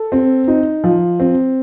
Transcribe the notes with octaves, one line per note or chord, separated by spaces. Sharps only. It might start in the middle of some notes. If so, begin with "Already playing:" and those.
Already playing: A4
C4
D#4
F3
C4